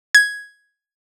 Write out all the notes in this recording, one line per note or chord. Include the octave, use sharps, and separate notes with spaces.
G#6